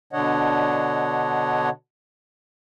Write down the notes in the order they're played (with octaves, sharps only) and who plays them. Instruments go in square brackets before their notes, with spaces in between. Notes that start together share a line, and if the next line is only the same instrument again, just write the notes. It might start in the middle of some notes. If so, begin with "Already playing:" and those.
[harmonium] B2 D3 D4 C#5 D#5 F#5